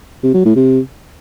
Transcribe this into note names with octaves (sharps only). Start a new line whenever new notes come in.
C3
F#3
A2
C3